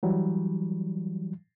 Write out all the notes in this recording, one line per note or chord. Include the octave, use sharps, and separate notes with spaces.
E3 F#3 G3